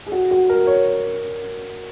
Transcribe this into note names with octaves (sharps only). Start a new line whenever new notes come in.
G#4
F#4
F#4
A#4
C#5